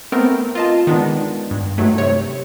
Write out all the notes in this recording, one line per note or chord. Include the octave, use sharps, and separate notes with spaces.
A3 B3 C4 A#4
F4 D#5 A5
D#3 G#3 B3 D4
G2
G2 D#3 F#3 A3
C3 C#5